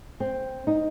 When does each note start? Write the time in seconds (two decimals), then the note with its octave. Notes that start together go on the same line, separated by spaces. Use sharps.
0.20 C4
0.67 D#4